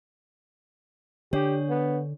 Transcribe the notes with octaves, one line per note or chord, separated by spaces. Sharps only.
D3 D4 G4 C#5
B3